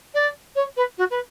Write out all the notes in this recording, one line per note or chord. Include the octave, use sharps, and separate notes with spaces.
D5
C#5
B4
F#4
B4